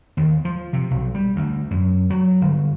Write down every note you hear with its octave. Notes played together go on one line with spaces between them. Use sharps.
D#2
F3
C3
B1
G3
D2
F#2
F#3
G1